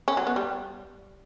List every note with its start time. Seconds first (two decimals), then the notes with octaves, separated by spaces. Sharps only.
0.08 C#4
0.17 F#3
0.27 B3
0.36 G3